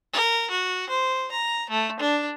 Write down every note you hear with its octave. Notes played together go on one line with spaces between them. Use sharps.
A#4
F#4
C5
A#5
A3
D4